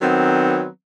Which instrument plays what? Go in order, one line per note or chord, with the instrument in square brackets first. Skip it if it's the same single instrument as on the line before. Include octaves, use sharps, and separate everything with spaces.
[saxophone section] D#3 F#3 B3 C4